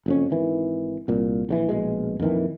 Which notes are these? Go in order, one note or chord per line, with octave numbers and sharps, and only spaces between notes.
F#1 F2 C#4
G#1 D#3 E3
C2 A#2
A#1 C#3 E3
A#1 B2 G#3
F2 A#2 D#3 E3